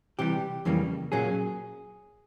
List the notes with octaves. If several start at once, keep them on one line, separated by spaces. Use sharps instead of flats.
C3 E3 G3 G4
F2 C#3 E3 G3 A#3
A#2 F#3 A#3 C#4 G#4